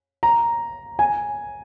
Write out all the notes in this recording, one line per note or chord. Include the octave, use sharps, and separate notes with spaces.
A#5
G#5